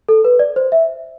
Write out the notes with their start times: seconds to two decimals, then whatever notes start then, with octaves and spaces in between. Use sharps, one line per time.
0.09 A4
0.25 B4
0.39 D5
0.56 C5
0.72 E5